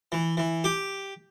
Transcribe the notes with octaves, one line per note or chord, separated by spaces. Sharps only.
E3
E3
G4